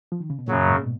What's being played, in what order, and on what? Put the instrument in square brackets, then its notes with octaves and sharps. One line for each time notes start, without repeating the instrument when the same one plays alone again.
[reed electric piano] F3
D#3
C#3
B2
[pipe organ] F#2 C#3 F#3 [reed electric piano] A#2
[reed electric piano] G#2
B2